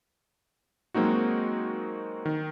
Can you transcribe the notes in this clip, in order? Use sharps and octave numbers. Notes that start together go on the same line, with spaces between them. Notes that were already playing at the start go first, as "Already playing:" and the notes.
F#3 G#3 A#3 C4 D#4 F#4
D#3